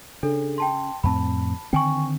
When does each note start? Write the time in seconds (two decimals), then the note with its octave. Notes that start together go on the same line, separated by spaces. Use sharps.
0.23 C#3 D4 A4
0.58 G5 A5 C6
1.04 F2 A2 C4 A5 B5
1.73 D3 D#3 C4 G5 G#5 C#6